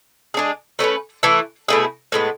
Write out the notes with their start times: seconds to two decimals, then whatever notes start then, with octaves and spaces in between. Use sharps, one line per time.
0.34 G#3 D4 G#4
0.79 A3 C#4 G#4 B4
1.23 E3 A3 E4
1.68 B2 A3 E4 G#4
2.12 A2 G#3 B3